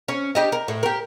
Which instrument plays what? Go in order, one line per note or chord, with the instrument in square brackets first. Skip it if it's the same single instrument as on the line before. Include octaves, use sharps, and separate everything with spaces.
[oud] C#4
D4 G4 D#5
A#4
A2
G4 A#4